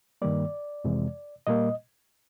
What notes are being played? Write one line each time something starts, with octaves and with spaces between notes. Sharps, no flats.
G2 D#3 G3 A#3 D5
F2 C3 E3 G#3
A#2 G3 A#3 D#5